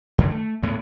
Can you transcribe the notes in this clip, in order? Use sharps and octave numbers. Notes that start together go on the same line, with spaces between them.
F2 D3 D#3
A3
D2 A2 G#3 B3